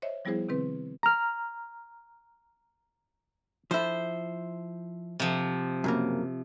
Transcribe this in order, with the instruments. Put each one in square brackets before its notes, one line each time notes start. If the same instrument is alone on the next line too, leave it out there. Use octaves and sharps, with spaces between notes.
[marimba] C5 C#5 D#5 E5
F3 G3 B3 E4 G#4 C5
C3 D#3 C4 B4
[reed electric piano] A#5 F6
[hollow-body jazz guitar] F3 E4 [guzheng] C5
[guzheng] C3 F3
[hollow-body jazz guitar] F#2 C#3 A#3